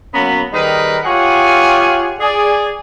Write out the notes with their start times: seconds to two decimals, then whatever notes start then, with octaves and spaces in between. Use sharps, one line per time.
0.14 F#3 A#3 B3 C#4 A#5 B5
0.53 D#3 G3 D#4 G#4 A#4 B4
1.04 F4 G4 G#4 C#5 F#5 G#5
2.20 G#4 D5